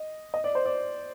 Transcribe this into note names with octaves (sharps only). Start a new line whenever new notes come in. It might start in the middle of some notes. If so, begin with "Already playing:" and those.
Already playing: D#5
D#5
D5
C5
D5